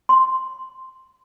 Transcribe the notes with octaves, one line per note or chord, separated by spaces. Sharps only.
C6